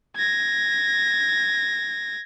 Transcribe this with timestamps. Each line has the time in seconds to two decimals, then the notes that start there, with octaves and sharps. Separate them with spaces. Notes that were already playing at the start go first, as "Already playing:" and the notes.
0.16 G#6 A#6